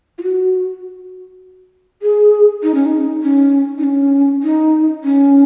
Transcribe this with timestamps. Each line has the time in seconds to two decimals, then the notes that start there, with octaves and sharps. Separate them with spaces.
0.18 F4
0.23 F#4
2.02 G#4
2.63 D#4
2.75 C#4
2.86 D#4
3.23 C#4
3.78 D#4
3.84 C#4
4.43 D#4
5.04 C#4